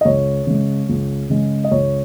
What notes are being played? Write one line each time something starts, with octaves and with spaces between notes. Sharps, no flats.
D#5
C#2 C#5
C#3 G#3
C#2
C#3 G#3
D#5
C#2 C#5